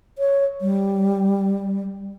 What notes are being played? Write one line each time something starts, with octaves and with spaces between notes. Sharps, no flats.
C#5
G3